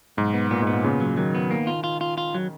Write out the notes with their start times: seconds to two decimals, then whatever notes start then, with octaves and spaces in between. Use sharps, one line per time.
0.17 B1 G#2
0.34 B3
0.51 A#2 B3
0.62 G#2 B3
0.73 A#2
0.84 A#2 C#3
1.00 F#3
1.17 D#3 F#3
1.35 B3
1.51 D#3 A#3
1.67 F4
1.84 F4
2.01 F4
2.18 F4
2.35 F#3